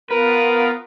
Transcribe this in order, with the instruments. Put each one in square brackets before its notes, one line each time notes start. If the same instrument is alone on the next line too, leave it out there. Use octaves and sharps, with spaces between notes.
[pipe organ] B3 F4 [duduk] A#4 [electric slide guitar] B4